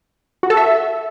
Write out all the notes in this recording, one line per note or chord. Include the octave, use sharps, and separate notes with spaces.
F#4
A4
E5